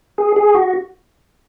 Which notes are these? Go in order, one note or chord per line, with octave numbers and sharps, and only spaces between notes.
G#4
G#4
F#4